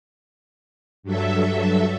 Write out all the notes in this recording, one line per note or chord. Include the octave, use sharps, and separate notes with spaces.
G2 F#3 A4 E5